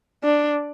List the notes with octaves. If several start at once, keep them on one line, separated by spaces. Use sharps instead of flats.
D4